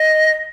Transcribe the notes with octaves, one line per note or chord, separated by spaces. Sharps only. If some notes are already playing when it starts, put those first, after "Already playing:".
Already playing: D#5